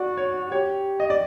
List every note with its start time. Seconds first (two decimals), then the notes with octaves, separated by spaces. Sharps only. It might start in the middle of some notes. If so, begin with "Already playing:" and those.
Already playing: F#4 D5
0.17 C#5
0.51 G4 C#5
1.00 D#5
1.10 D5